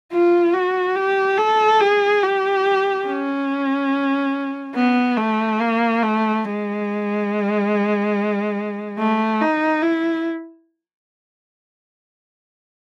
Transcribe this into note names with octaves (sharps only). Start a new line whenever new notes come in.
F4
F#4
G4
A4
G#4
G4
C#4
B3
A3
A#3
A3
G#3
A3
D#4
E4